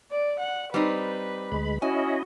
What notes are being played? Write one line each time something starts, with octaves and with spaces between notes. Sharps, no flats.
D5
F#5
G3 C4 D#4 B4
D2 G#3 B5
C#4 E4 F#4 D#5 G#5